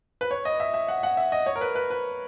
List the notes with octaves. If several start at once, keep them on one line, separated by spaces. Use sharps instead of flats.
B4
C#5
D#5
E5
E5
F#5
F#5
E5
D#5
C#5
A#4
B4
B4
B4